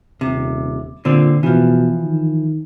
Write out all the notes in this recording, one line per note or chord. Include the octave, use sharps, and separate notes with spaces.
D#1 C3
A#2 D3 C4
B2 E3 F3
D#3